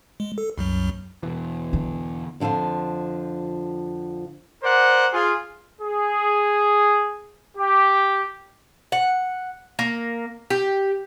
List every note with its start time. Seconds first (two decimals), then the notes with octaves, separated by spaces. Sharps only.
0.20 G#3
0.38 A4
0.58 C2 F#2 F#3
1.23 E2 B2 E3
1.73 D3
2.40 F2 D3 E3 F3 F4
4.63 A#4 C5 D5 F#5
5.13 F4 G#4
5.81 G#4
7.57 G4
8.92 F#5
9.79 A#3
10.50 G4